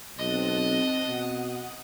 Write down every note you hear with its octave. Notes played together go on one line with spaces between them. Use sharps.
B1 C4 D#5 A5 F#6
B2 F#5 D#6